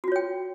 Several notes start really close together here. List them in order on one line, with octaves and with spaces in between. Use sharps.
F#4 F4 C#5 G5